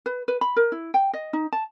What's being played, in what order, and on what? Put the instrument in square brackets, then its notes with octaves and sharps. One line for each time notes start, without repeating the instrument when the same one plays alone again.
[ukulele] B4
B4
B5
A#4
E4
G5
D#5
D#4
A5